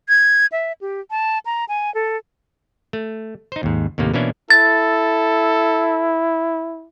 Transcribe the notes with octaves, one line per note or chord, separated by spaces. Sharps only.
G#6
E5
G4
A5
A#5
G#5
A4
A3
D#4 C5
D#2 G#2
D#2 A2 C3 A#3
B2 E3 A#3 C#4 D4 E4
E4 A4 A6